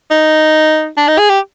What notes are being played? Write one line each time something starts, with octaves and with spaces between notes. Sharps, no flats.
D#4
D4
D#4
G#4
G4